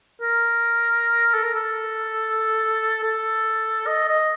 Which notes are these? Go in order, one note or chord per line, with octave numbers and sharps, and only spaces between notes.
A#4
A4
A#4
A4
A4
D#5
D#5